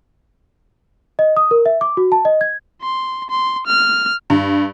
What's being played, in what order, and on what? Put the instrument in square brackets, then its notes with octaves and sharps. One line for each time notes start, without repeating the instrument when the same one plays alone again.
[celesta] D#5
D#6
A#4
E5
D6
F#4
A5
D#5
G#6
[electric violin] C6
C6
F6
[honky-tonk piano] G2